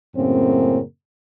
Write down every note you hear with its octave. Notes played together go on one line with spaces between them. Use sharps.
F#2 A2 C#3 A#3 C4